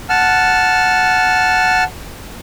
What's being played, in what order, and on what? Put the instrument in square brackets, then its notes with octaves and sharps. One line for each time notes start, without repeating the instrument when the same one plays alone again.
[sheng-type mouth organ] F#5 A5 F6